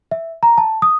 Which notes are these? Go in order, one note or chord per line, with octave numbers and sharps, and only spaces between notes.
E5
A#5
A5
D#6